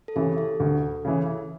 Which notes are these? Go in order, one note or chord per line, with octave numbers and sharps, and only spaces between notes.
A4
C#3 E3 G4
A4
D2
C#3 E3